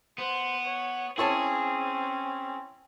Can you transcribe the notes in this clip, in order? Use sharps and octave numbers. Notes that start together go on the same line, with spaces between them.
B3 C5
C#5
C4 C#4 E4 G#4 C#5 A5